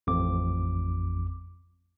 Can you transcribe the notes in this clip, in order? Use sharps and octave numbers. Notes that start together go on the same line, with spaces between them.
A1 F2 D6